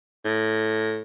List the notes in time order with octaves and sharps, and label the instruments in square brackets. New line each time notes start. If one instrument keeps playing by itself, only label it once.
[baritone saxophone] A2